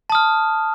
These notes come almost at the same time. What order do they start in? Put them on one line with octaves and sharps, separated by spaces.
A5 D#6 F6